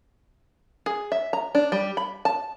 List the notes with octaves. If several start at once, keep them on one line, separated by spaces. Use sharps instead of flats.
G#4
E5
A#5
D4
G3
B5
A5